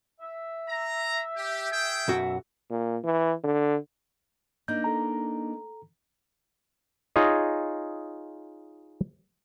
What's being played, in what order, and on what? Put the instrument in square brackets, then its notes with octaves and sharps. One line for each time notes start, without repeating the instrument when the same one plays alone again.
[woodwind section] E5
[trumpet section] A#5
G4
G#4 G5
[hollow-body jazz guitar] B1 F#2 F#4
[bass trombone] A#2
E3
D3
[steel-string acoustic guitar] A#3 D4 D#4 [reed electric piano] G6
[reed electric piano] A4 A#5
[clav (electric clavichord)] D#4 F4 G#4 C#5 D#5